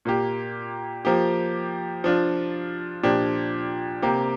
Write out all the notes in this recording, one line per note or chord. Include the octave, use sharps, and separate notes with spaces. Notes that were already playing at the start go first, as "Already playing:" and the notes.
A#2 A#3 G4
F3 A#3 G4
F3 D4 F4
A#2 F3 D4 G4
C3 A#3 G4